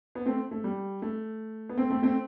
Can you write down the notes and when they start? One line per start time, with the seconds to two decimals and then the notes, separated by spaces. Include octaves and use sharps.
0.15 B3
0.26 A3 C4
0.51 A3
0.64 G3
1.02 A3
1.69 B3
1.77 A3 C4
1.90 A3 C4
2.03 A3 C4